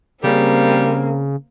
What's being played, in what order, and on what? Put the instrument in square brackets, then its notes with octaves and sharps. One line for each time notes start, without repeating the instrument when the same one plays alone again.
[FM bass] C#3 [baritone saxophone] G3 [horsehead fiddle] A#3 C4